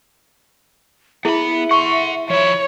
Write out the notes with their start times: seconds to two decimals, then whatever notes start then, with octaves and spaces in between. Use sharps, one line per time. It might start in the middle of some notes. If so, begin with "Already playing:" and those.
1.25 B3 E4 G#4 E5 B5
1.71 F#5 C6 C#6
2.30 F3 E4 C#5